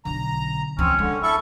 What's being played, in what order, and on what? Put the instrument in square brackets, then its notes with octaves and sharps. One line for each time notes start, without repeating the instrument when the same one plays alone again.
[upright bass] B1 D3 [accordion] A#5
[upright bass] D2 E3 [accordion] C4 [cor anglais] C#4
[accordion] D3 [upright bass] G#3
[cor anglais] E4 [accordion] A4 C#6